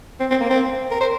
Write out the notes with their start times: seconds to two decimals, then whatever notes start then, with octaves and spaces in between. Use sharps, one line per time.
0.20 C4
0.30 C4
0.40 A#3
0.50 C4
0.91 A#4
1.01 C5